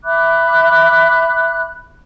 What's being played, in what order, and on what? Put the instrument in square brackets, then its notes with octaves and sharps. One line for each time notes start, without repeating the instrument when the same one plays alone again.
[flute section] E5 B5 D6 F#6